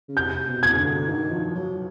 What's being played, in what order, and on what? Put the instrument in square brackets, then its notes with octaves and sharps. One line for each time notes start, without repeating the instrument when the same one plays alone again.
[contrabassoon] C#3
[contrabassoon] C3 [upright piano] G6
[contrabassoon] B2
[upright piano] G#6
[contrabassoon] C#3
D3
D#3
F3
F#3